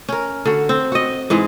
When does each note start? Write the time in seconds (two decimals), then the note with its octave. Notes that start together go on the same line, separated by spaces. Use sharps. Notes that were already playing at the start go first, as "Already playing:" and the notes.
0.08 C#4 A#4
0.45 D3 F#4
0.69 C4
0.92 F#4 D#5
1.30 G#2 E3 G#3